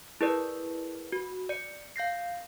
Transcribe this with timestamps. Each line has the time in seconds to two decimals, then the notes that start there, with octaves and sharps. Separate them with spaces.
0.21 E4 G#4 A#4 B4 D5
1.12 F#4
1.49 D5 C#7
1.96 F5 G6 A#6 C7